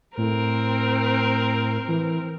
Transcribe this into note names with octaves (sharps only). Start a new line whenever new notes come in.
A2 C4 A#4
E3